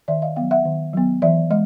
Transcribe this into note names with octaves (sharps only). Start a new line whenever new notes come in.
D#3 D5 E5
D#5 F5
F#3 B3 F5 G5
E5 F#5
D#3
F#3 B3
E3 D5 E5
G#3 D#5